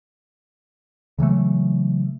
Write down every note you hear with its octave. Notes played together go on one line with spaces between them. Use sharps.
C#3 E3 F#3 A3